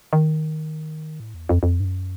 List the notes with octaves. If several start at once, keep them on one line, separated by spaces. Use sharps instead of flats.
D#3
A2
E2
F2
F2
G2
F#2